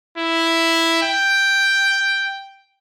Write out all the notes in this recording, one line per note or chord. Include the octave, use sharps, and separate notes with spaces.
E4
G5